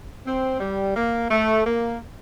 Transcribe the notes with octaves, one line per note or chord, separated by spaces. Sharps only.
C4
G3
A#3
A3
A#3